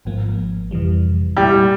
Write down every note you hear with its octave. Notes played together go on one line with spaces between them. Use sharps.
G#1 G#2 F3 A#3
F2 C3 E3 G3
A#2 G3 G#3 E4